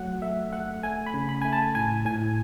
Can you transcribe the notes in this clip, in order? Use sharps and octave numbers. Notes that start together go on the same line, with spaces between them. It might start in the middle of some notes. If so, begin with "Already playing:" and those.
Already playing: F#3 A3 F#5
A3 E5
A3 F#5
A3 G#5
B5
C#3
B5
A3 G#5
A5
A2 G#5
A2 G#5